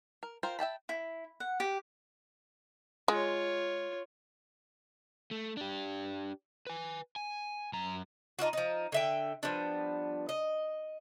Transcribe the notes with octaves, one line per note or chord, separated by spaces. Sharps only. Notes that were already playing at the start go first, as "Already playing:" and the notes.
A#4
F4 A#4 C5 G5
E5 G5 A5 B5
E4
F#5
G4
G#3 F4 C#5
A3
D4 G4
B4 G#5
G#5
F#2 A#5
D4 D#4 F4 F#4
F3 D#4
D3 E5 G5
F3 G3 B3 D4
D#5